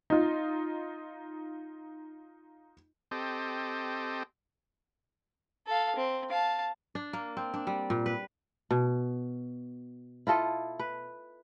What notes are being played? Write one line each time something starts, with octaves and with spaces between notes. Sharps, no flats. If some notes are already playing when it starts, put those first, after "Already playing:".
D#4 F4
C4 G4 A4 D#5
A4 F5
C4
F5 A5
D4
A#3
C4
D4
G3
A#2
B4
B2
E4 F4 A4 D#5
B4